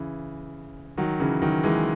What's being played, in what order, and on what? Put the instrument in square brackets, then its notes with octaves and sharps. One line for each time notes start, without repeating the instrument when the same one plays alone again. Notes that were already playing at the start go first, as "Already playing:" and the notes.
Already playing: [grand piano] C#3 E3
D#3 F#3
C#3 E3
D#3 F#3
E3 G#3